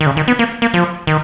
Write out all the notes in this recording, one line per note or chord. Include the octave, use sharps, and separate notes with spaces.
D#3
C#3
D#3
B3
A#3
A#3
F3
D#3